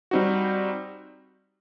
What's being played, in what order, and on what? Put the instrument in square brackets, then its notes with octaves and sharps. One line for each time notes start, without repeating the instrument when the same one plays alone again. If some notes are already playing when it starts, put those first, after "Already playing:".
[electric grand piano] G3 C4 D#4 F#4